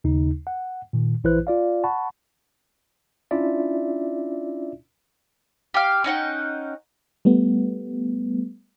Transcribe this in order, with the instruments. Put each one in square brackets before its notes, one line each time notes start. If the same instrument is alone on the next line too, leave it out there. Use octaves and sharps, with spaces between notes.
[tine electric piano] D#2 C#3 D#4
F#5
A#2 D#3
A#1 E3 E4 B4 C5 F#6
F4 D5 F5
F#5 A5 B5 C#6
C#4 D4 E4 F4 D5 E5
[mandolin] G4 F5
C#4 D#4 F#5 G5
[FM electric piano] G3 A3 B3